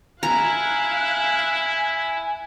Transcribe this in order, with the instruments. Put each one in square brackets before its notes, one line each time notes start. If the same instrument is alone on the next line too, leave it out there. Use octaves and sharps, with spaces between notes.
[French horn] E4 [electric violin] F5 F#6 [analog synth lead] G#5 [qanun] A#5